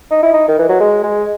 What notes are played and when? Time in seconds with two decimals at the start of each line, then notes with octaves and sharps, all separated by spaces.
0.11 D#4
0.23 E4
0.34 D#4
0.48 D#3
0.59 E3
0.69 F#3
0.80 G#3
1.03 G#3